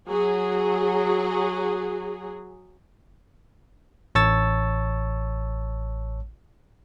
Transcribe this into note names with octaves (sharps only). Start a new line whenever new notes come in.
F#3 G#4
A1 C#5 A5 C#6 E6 A6